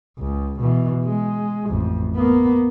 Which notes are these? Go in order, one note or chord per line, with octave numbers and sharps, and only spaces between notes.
C#2
B2 E3
G#3
A1 F2
A#3 B3